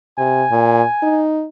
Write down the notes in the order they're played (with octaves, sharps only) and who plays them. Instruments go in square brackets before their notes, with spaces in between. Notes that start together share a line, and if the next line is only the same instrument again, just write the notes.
[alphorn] C3 [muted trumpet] G#5
[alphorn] A#2
D#4